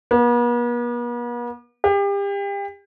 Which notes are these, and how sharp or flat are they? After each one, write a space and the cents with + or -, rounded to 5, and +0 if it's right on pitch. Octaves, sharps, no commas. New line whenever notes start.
B3 -45
G4 +35